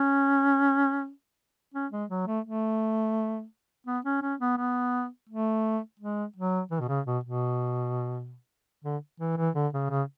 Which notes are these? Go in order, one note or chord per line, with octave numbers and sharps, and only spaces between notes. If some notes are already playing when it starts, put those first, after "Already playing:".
Already playing: C#4
C#4
G#3
F#3
A3
A3
B3
C#4
C#4
B3
B3
A3
G#3
F#3
E3
B2
C#3
B2
B2
D3
E3
E3
D3
C#3
C#3